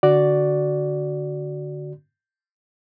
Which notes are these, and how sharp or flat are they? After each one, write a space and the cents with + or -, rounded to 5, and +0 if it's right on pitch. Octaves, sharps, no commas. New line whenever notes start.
D3 +0 F#4 +5 D5 +0